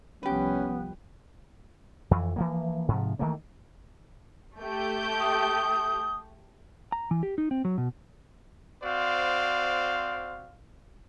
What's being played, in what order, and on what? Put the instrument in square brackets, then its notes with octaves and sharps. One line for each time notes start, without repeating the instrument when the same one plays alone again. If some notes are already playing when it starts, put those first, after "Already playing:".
[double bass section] C2 F3 G3 [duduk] B3 [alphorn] C#4 [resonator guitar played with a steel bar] G4 B4
[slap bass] F2 E3
E3 F3 A#3
G#2 C3 F3
D#3 E3 A3 A#3
[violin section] A3 G4 G6
[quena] D#6
[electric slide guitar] A#5
E3
G4
D#4
C4
F#3
B2
[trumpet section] C4 F#4 C5 D5 F5